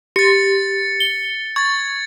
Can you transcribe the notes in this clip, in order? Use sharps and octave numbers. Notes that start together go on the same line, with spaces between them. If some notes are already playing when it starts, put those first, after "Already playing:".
G4 A6 C#7
G7
C#6 G#6 A6